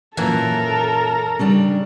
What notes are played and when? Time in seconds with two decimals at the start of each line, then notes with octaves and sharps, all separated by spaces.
0.17 F#2 A#2 E3 F#3 A#3 A4 A#4
1.39 C#3 G3 D4